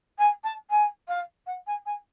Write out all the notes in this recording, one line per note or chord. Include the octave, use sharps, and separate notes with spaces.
G#5
A5
G#5
F5
F#5
G#5
G#5